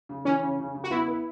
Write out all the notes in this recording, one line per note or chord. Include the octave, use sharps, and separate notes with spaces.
C#3
E3 C#4
C#3
C#3
C#3
F#4
B3 E4
B4